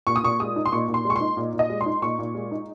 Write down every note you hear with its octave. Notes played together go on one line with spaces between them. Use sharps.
A#2 C#6
D#6
A#2 C#6
G#3 D#6
D#4
C6
A#2 C#6
A#2
C6
G#3
C#6
D#4 C6
A#2
A#2
D#5
G#3
C6
D#4
A#2 C#6
A#2
G#3
D#4